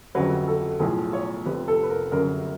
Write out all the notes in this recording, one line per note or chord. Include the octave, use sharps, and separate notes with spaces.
G1 F2 C#3 F#3 B4
A4
B1 A2 F3 G#4
C#5
F1 F2 C3 B4
A4
B4
A#4
G1 F#2 C#3 A#4